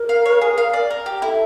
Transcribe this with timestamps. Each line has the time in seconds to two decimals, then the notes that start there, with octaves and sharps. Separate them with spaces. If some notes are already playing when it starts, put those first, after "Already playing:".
Already playing: A#4
0.09 F5
0.26 C#5
0.41 G#4
0.58 F5
0.73 D5
0.90 A#4
1.06 G4
1.22 E4 A4